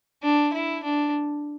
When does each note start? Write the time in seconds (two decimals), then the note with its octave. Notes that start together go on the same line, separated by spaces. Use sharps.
0.23 D4
0.53 E4
0.83 D4